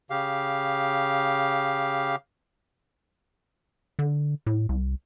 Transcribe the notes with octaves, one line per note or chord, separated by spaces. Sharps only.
C#3 G4 F5
D3
A2
C2